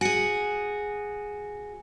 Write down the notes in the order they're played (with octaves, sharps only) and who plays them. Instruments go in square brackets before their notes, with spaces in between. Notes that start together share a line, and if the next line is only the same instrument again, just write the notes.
[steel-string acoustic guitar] F#4 G#4 [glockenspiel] G#5 C#7